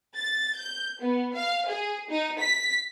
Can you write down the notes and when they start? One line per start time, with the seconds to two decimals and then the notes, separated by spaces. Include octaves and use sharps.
0.16 A6
0.57 G6
1.00 B3
1.35 F5
1.68 G#4
2.10 D#4
2.40 B6